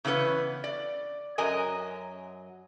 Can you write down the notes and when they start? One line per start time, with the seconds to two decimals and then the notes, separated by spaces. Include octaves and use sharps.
0.05 C#3 E3 B3 C#4 B4
0.64 D5
1.38 F#2 F#3 A#4 D#5 G#5